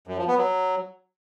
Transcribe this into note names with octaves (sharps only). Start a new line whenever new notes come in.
F#2
F3
B3
F#3